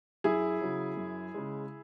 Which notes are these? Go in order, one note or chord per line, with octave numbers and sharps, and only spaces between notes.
F#2 E4 G#4
C#3 F#3
F#2
C#3 G#3